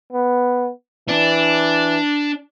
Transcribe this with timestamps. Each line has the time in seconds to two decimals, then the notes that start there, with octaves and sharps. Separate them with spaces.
0.13 B3
1.08 E3 D4